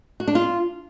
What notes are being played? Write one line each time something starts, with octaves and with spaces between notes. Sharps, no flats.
F#4
D4
F4